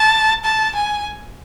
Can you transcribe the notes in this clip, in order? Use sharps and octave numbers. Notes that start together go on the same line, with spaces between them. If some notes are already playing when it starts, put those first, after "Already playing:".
Already playing: A5
A5
G#5